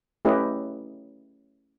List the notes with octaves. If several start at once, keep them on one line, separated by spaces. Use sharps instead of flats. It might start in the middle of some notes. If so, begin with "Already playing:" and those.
A3 C#4 E4 G4 B4 D#5